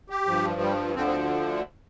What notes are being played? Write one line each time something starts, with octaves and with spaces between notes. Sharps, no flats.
G4
G2 F3
G3
D2 D3 F3 C4
C4